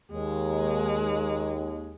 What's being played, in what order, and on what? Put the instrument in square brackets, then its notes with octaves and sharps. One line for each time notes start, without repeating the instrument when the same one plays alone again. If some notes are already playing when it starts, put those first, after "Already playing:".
[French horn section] D#2 [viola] G#3